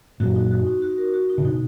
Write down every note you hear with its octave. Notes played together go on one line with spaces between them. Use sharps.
F#2 A#2 F#4
D#4
F#4
D#4
F#4
A#4
F#4
D#4
C#3
B2 D#4